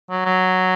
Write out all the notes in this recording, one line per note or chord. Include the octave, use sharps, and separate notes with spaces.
F#3
F#3